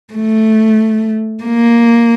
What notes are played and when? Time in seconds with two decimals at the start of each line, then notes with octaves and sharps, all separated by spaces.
0.14 A3
1.44 A#3